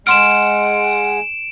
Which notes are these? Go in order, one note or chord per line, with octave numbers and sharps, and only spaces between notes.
G#3 F#5 C6 F6 D7 E7